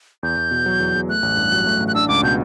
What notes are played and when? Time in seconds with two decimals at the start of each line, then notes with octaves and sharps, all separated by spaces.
0.23 E2 G6
0.37 E2
0.51 B2
0.66 F#3
0.80 E2
0.95 E2
1.09 A3 F#6
1.23 A1
1.37 G2
1.52 F#3
1.66 A3
1.80 A1
1.88 F#6
1.95 D4 E6
2.08 C#2 D6
2.23 B2 G6